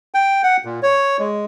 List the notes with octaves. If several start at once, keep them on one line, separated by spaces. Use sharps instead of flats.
G5
F#5
A#2
C#5
G#3